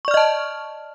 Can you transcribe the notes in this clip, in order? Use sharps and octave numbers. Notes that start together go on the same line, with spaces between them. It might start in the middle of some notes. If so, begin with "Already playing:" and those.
D5 D#5 A5 C#6 F6